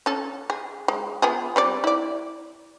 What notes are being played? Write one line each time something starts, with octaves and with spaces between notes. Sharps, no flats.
C#4 A4
G#4
G#3
B3 F4 G#4
G3 C4 D5
E4 D5